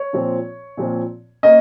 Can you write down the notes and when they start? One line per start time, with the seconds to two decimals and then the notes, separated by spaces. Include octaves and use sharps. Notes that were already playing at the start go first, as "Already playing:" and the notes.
Already playing: C#5
0.13 A#2 F3 C4
0.77 A#2 F3 C4
1.43 A#3 C#4 D#5